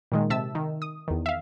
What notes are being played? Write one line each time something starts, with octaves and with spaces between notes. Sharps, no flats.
A#2 D#3 G#3
C3 E5 A5 E6
D#3
D#6
E2 D#3
E5 F5